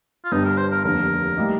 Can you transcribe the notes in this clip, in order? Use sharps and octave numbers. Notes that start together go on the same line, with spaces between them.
F4
G1 G2 D3 G3 D#4
A#4
C5
A#4
F1 D#2 D3 A#4
A2 G3 A#3 D#4